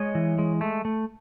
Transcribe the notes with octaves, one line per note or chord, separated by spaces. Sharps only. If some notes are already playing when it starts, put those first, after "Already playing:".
Already playing: G#3 C#5 D#5
E3
G#3
A3
A3